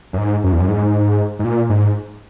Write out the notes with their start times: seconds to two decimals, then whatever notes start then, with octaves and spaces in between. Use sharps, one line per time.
0.13 F#2
0.18 G#2
0.44 F#2
0.52 E2
0.60 F#2
0.68 G#2
1.39 G#2
1.44 A#2
1.70 G#2